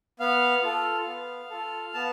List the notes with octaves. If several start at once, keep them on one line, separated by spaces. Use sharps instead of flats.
B3 F5
F4 A4
B3
F4 A4
B3 A5